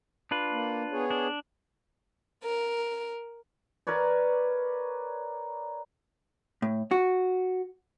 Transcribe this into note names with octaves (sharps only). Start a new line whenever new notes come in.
D4 F4 B4
A#3
B3 G#4 C#5
D4
A#4
A#4 B4 C#5 D5
A2
F#4